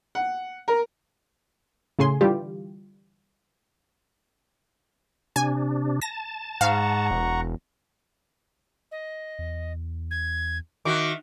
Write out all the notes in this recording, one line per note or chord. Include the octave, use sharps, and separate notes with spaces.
F#5
A#4
A2 C#3 G#4 G#5 C6
D3 E3 G3 F4 G4
C3 D4 G#5
A5 A#6
G#2 F5 F#5 A#5 C#6
E1
D#5
E2
G#6
D#3 F#4 E5 D6